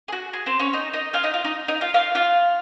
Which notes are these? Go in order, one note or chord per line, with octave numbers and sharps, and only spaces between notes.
G#4
F#4
G#4
C4 C5
C#4 C#5
D#4 D#5
D#4 D#5
F4 F5
D#4 D#5
F4
D#4
D#4 D#5
F4 F5
F4 F5
F4 F5